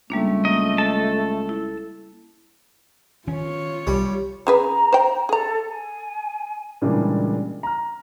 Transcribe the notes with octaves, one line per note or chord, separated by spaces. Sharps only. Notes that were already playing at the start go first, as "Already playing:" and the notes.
C#2 G3 A3 A#3 D4
A#3 D#5
A4 D#5 A5
E4
D#3 C#4 F4 C#5
C2 G3
C#3 G#4 B4 A#5
C5 G5
G#4 A4 A#5
G#5
A#2 C#3 E3 G3 G#3 D4
A#5 F6